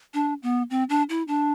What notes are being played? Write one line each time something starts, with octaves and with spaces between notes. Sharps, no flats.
D4
B3
C4
D4
E4
D4